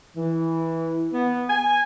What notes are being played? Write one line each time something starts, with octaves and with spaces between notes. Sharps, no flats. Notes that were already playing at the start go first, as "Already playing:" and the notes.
E3
B3
G#5